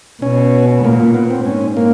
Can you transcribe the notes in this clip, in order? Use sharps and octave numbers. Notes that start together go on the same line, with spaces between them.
B2 C#4
A#2 A#3
A#3
B3
C4
G#2 C#4
A#3